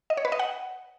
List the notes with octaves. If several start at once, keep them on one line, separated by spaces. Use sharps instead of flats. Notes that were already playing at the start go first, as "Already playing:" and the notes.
D#5
C#5
B4
D#5
F#5